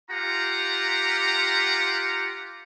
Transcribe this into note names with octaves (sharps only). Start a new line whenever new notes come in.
F4 G4 F#5 A#5